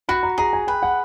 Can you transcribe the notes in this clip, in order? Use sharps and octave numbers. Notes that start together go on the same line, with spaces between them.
F#4 B5
A#5
G#4 A#5
G#5
B4 G5
F#5